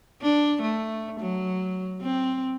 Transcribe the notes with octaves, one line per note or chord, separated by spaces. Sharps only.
D4
A3
F#3
C4